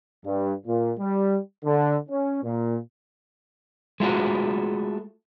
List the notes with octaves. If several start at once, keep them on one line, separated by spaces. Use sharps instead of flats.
G2
A#2
G3
D3
C#4
A#2
G#3 A3 F4 F#4